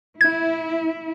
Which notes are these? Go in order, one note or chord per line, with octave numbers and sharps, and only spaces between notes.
E4 G#6